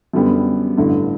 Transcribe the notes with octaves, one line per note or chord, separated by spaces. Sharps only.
F#2 D3 G3 B3
A1 G2 D3